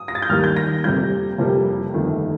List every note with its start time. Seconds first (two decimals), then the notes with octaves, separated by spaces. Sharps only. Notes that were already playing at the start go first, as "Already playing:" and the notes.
Already playing: D#6
0.08 A#6
0.15 A6
0.22 G6
0.29 D#2 D#3 G3 A#3 F6
0.44 G6
0.56 A#6
0.84 F1 F2 C3 G3 A#3 G6
1.38 F1 F2 C3 G3 A#3
1.93 G1 F2 D#3 A3